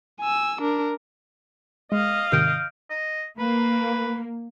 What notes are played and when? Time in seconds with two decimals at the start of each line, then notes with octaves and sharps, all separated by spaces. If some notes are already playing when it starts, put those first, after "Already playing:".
0.20 G#5 E6
0.61 D4 A#4
1.92 G#3 D#5 F5
2.32 G#2 C3 D#3 F6 G6 D7
2.90 D#5
3.39 A#3 B4